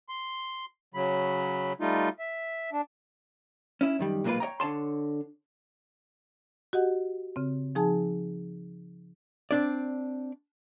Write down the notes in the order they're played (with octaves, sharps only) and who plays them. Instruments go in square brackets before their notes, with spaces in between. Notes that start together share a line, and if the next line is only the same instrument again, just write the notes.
[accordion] C6
C#3 F#3 B5
G3 A3 D#4 F4
E5
D4
[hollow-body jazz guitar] C#4 E4
F#2 D#3 G3
B1 A#2 G#3 A#3 F4 B4
C#5 D#5 G5 A#5
D3 C#5 A5 C6
[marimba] F#4 G4 D#5 F#5
C#3 C4
F3 D#4 G#4 G#5 A5
[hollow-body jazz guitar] C4 D4 D5